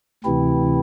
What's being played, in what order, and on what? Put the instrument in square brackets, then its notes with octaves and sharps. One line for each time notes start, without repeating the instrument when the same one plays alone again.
[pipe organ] D2 C3 E3 C4 E4